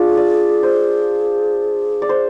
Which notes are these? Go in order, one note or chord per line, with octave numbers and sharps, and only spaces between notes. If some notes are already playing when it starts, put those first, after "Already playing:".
Already playing: D4 F4 G#4
D5
C5
D5
C5